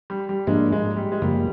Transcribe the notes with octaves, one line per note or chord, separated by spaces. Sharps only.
G3
G3
G#2 F3 G#3 A#3 D4
G#3
G3
G#3
F#2 C#3 F3 G3 A#3